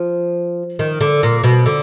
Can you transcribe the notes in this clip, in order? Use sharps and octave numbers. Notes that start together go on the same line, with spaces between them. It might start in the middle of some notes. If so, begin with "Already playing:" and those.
Already playing: F3
D#3
D3
A#2
B2
D3